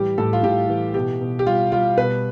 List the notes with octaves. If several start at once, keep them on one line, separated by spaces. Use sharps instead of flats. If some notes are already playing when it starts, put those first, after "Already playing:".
Already playing: A2 E3 G3 G4
A2 A4
F4
A2 G4
E3
B2 G4
B2
G4
G3 F4
G3 F4
B2 B4